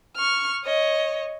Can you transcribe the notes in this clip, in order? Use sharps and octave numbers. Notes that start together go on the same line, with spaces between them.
C#6 F6
C#5 D#5